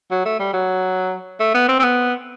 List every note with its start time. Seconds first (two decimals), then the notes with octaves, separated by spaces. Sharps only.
0.11 F#3
0.25 A3
0.40 G3
0.54 F#3
1.40 A3
1.55 B3
1.69 C4
1.79 C4
1.83 B3